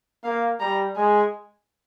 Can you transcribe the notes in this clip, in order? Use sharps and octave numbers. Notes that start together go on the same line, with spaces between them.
A#3 F5
G3 A#5
G#3 G#5